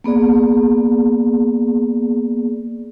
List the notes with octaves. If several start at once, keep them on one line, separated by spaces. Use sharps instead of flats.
A#3 B3 G#4 D5